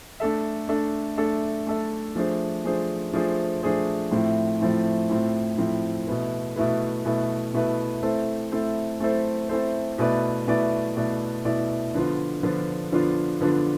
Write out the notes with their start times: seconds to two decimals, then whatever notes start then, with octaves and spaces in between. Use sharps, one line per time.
0.20 A3 D4 A4 E5
0.69 A3 D4 A4 E5
1.17 A3 D4 A4 E5
1.67 A3 D4 A4 E5
2.15 F3 A3 D4 G#4 C5
2.65 F3 A3 D4 G#4 C5
3.13 F3 A3 D4 G#4 C5
3.62 F3 A3 D4 G#4 C5
4.11 A2 F3 A3 C4 E4
4.60 A2 F3 A3 C4 E4
5.09 A2 F3 A3 C4 E4
5.58 A2 F3 A3 C4 E4
6.07 B2 A3 E4 B4
6.56 B2 A3 E4 B4
7.05 B2 A3 E4 B4
7.54 B2 A3 E4 B4
8.03 A3 C4 E4 A4 C5
8.52 A3 C4 E4 A4 C5
9.00 A3 C4 E4 A4 C5
9.49 A3 C4 E4 A4 C5
9.98 B2 A3 E4 B4 D5
10.47 B2 A3 E4 B4 D5
10.96 B2 A3 E4 B4 D5
11.45 B2 A3 E4 B4 D5
11.94 D3 F3 B3 D4 F4
12.43 D3 F3 B3 D4 F4
12.92 D3 F3 B3 D4 F4
13.41 D3 F3 B3 D4 F4